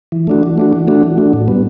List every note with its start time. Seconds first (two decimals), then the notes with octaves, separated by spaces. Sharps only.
0.12 E3
0.27 A3 D4 F#4
0.43 E3
0.58 A3 D4 F#4
0.73 E3
0.88 A3 D4 F#4
1.03 E3
1.18 A3 D4 F#4
1.33 A2
1.48 G3 B3